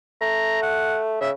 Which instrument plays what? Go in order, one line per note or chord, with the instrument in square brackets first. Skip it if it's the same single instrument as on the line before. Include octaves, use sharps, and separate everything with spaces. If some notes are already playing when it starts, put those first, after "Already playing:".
[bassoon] A3 [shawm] A#5
[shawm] F#5
[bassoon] C#3 [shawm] E5